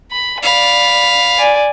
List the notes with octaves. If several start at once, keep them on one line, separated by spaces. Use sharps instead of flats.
B5
D5 F5 B5
D5 G#5